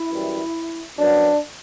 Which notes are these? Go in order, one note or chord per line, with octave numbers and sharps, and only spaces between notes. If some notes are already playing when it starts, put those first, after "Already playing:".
Already playing: E4
F#2 E3 G3
F#2 F#3 B3 D4